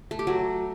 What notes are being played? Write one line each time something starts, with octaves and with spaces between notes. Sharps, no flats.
A3
G4
F#3